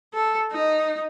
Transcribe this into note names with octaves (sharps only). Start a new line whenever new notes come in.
A4
D#4